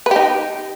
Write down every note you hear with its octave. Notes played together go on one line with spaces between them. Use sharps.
D#4 G4 B4